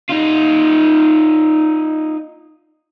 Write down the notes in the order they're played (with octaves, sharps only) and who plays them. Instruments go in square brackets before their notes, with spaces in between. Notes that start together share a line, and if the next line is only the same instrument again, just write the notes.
[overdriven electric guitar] D#4 F4